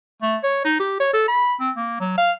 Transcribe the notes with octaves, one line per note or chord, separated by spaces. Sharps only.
A3
C#5
D#4
G4
C#5
A4
B5
C4
A#3
F#3
F5